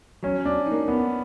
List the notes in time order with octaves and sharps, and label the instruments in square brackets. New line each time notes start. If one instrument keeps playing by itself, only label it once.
[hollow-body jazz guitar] F#3 [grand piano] C#4
[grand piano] D4
[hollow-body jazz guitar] D#4
A#3
[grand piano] B3